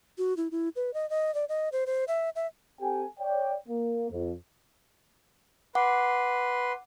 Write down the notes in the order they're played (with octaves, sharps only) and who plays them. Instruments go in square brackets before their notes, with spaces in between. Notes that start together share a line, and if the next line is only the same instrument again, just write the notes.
[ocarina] F#4
E4
E4
B4
D#5
D#5
D5
D#5
C5
C5
E5
E5
[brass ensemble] C4 G4 A4 G5 G#5
C#5 D5 G5
A#3
F2
[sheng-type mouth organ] B4 C6 [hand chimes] F#5 D6